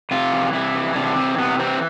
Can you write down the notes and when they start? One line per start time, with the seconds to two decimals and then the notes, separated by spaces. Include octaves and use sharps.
0.11 C3 F4
0.32 E3
0.53 C3 E4
0.75 E3
0.95 C3 D4
1.16 E3 C4
1.38 C3 B3
1.59 E3 C4